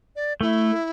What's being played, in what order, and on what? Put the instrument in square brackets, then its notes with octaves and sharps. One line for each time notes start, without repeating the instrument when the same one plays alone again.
[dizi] D5
[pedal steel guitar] A3 [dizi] E4